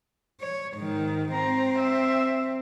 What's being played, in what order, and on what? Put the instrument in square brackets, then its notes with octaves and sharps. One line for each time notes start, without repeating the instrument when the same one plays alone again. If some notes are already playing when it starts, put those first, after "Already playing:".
[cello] C#5
G#2 D#3
[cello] C4 [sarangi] A#5
[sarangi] E5